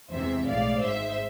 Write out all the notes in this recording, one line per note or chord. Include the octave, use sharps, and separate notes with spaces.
E2 C3 E3 G#3 C5 E5
B1 A2 G#3 D5 F5
G#1 G#2 G#3 C5 E5